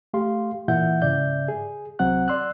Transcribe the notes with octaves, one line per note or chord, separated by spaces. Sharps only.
A3 G4 F5 C6
A#2 E3 E4 E5 F#5 G6
G#2 C#3 D5 E5 G6
G#4
C2 F#3 C4 F#5 F#6
D5 C6 E6 F#6